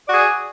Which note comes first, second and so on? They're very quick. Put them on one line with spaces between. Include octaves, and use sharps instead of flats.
D5 F#4 G#4